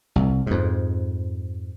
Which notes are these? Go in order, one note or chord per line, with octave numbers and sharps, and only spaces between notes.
C2
F2 G#2